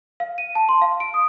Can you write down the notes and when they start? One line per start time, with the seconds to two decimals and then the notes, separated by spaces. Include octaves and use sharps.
0.20 F5
0.38 D#7
0.55 A5
0.69 C6
0.82 F5
1.00 D7
1.14 D#6